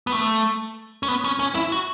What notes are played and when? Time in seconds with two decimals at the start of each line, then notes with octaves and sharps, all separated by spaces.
0.07 B3
0.12 A3
1.03 C#4
1.08 B3
1.24 C#4
1.39 C#4
1.55 E4
1.72 F#4